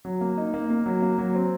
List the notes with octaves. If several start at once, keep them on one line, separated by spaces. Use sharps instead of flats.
F#3
A#3
D#4
A#3
A#3
F#3
A#3
F#3
C4